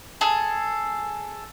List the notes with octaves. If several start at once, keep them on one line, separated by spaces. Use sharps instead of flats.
G#4 A4